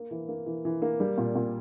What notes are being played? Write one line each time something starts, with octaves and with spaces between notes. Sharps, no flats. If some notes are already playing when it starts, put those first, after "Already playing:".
Already playing: A#3
E3
A#3
E3
E3
A#3
G3
A#2
A#2